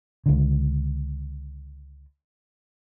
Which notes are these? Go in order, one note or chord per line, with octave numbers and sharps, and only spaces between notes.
C#2 D3